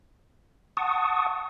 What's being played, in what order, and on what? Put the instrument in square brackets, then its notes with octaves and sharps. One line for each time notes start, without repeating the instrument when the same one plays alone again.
[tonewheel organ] F#5 A5 C#6 D#6